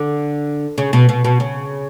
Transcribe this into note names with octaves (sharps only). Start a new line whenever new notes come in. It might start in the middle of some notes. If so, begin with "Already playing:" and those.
Already playing: D3
C#3
B2
B2
B2
C#3